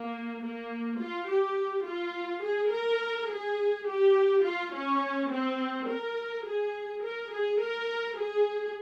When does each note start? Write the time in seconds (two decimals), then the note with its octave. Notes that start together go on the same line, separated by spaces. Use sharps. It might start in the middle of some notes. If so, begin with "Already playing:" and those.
Already playing: A#3
0.41 A#3
0.99 F4
1.27 G4
1.85 F4
2.43 G#4
2.71 A#4
3.29 G#4
3.86 G4
4.43 F4
4.72 C#4
5.30 C4
5.87 A#4
6.45 G#4
7.02 A#4
7.31 G#4
7.60 A#4
8.17 G#4